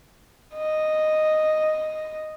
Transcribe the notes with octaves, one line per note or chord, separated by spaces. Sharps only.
D#5